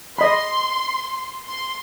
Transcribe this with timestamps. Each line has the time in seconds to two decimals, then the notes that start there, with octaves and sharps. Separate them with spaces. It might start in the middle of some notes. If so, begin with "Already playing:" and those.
0.19 D#5 B5 C6
1.47 C6